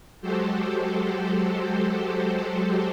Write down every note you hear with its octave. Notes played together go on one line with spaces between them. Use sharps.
F#3 G#3 F#4 G4 A4 C5